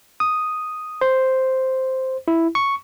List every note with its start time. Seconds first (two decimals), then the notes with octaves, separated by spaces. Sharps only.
0.20 D#6
1.01 C5
2.28 E4
2.55 C#6